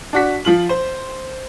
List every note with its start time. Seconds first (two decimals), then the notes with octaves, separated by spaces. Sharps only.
0.13 D4 F#4 B6
0.45 F3 F4 F#7
0.69 C5